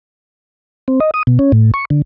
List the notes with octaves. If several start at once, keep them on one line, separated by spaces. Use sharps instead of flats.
C4
D#5
D#6
B2
C#4
A2
C#6
D3